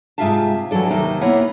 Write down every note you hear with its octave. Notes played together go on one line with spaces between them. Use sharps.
G#2 C3 F4 E5 F5 A5
E3 F#3 D4 A4 D5
D#2 C3 D#4 E5
A#3 B3 E4 C#5 F#5